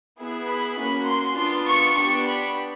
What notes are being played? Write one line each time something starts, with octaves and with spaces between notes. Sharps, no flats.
B3 E4 G#4
B5
A#3 C#4 F#4
C6
B3 D4 F4 C6
C#6
B3 D4 G4 C#6
B5